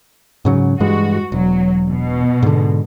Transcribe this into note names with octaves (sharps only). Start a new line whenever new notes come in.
G#2 C#3 F#3
G2 E3 G#3 F#4
E1 F#3
B2
G#2 D3